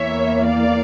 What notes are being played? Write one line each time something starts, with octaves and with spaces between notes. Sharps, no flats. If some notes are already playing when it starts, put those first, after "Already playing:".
Already playing: E2 E3 A#3 C#5 E5
D5 F5